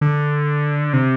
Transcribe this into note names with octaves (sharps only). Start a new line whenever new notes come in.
D3
C3